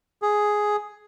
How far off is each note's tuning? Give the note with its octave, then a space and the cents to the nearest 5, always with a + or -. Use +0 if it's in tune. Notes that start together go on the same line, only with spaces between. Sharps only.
G#4 +5